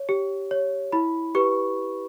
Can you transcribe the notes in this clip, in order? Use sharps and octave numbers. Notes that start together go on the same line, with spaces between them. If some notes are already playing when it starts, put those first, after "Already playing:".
Already playing: C#5
G4
C#5
E4 B5
G4 B4 C#6